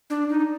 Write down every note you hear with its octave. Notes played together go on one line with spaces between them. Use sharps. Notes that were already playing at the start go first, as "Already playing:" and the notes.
D4
D#4